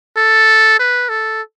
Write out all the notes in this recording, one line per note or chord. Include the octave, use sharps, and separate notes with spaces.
A4
B4
A4